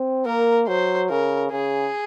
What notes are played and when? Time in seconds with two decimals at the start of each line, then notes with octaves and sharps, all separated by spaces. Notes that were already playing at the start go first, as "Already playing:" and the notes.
Already playing: C4
0.26 A#3 A#4
0.68 F#3 C5
1.10 C#3 A#4
1.51 C#3 G#4